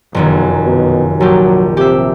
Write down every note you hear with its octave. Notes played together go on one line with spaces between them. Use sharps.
F1 B1 F#2 D#3
B2
A#1 F#3 G4
C3 G4 E5